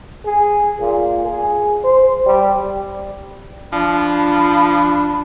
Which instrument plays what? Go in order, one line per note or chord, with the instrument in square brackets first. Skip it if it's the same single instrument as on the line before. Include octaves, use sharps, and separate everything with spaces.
[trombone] G#4
A#2
G#4
C5
G3
[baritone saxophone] F3 [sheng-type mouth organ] D4 [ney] B5